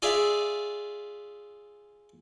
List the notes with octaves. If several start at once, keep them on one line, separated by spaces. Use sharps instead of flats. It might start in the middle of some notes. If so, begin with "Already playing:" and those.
F4 G#4 D5 E5